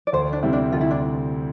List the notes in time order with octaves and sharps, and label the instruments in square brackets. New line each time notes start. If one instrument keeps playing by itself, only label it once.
[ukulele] D5
[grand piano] D2 [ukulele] C5
[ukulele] D4
[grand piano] C3 G3 C4 E4
[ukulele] D4
[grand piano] D2 [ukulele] F4
[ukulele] E4
D4